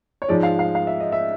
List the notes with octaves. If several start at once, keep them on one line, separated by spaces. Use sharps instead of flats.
C#5
G#2 F3 G#3 D5
F5
F5
F5
E5
D#5
E5